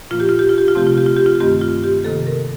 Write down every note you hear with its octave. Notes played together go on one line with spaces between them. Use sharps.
A#2 F3 A#3 F4
G4
F4
G4
F4
G4
F4
C3 F3 A3 C4 G4
F4
G4
F4
G4
F4
G2 D#3 A3 C4 G4
F4
G4
C3 D#3 A#3 A4
A#4